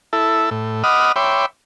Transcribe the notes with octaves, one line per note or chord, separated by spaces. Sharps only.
E4 A4
A2
D#5 F#5 B5 D6 D#6 F6
C#5 E5 G5 B5 C6 D6